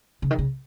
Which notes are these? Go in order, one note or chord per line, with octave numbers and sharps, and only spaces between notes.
C#3
D#3
C#3